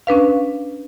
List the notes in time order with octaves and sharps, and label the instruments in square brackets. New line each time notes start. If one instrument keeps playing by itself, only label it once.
[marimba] C#4 D4 B4 F5